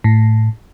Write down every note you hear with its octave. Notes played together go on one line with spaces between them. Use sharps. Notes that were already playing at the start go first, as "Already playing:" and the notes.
A2